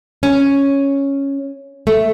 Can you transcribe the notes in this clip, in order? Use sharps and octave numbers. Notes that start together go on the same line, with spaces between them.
C#4
A3